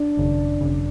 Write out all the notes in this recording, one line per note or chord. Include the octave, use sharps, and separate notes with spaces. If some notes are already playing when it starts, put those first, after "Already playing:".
Already playing: D4 D5
G#1 F#2 C#3
G#1 F#2 C#3